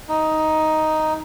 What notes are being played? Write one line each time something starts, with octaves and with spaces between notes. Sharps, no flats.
D#4